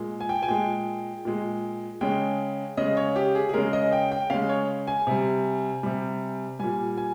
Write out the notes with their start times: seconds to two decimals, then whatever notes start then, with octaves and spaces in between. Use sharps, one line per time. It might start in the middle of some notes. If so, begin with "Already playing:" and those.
Already playing: A#2 G#3
0.21 G#5
0.29 G5
0.43 G#5
0.48 A#2 G#3 G5
1.25 A#2 G#3
2.01 C#3 G#3 G5
2.77 C#3 G#3 D#5
2.97 C#5
3.16 G4
3.35 G#4
3.49 G#4
3.54 C#3 G#3 A#4
3.73 D#5
3.92 G5
4.12 G5
4.30 C#3 G#3 F5
4.49 C#5
4.87 G#5
5.07 C3 G3
5.83 C3 G3
6.59 A#2 G3 G#5
6.98 G#5